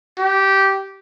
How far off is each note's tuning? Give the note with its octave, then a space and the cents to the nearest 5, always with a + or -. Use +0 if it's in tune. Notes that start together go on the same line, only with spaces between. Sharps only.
G4 -15